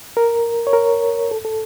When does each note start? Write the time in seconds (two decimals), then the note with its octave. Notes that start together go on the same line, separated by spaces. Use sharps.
0.17 A#4
0.67 C#5
0.73 A#4
1.31 A4
1.45 A4